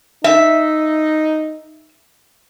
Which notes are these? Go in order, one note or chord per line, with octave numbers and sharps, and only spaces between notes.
D#4 E5